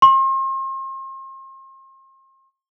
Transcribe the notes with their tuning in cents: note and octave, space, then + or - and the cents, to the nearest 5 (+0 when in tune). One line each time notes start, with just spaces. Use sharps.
C6 +40